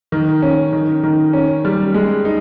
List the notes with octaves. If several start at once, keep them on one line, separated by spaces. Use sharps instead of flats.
D#3
C#4
D#3
D#3
C#4
G3
G#3
D#4